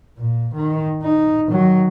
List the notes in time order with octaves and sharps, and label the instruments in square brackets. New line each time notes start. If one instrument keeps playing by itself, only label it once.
[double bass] A#2
D#3
D#4
D#3 F#3